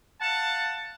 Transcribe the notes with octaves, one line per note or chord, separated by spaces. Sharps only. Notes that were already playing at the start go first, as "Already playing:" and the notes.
F5 F#5 A5